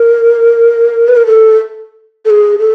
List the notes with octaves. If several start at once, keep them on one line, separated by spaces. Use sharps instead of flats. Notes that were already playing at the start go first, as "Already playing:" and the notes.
Already playing: A#4
B4
A#4
A4
A4
G#4
A4